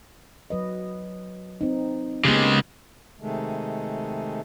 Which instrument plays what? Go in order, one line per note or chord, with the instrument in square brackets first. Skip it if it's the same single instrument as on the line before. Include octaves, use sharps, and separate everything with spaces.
[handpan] F#3 B4 D#5
C4 D#4
[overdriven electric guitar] C#3 G#3 [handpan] A#3 B3 G4
[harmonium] C3 D#3 G#3 A3